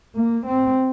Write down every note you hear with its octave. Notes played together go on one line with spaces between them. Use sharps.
A#3
C4